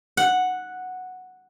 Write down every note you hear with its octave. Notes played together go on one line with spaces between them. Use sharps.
F#5